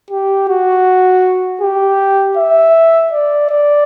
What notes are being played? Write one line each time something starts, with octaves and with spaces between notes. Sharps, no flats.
G4
F#4
G4
E5
D5
D5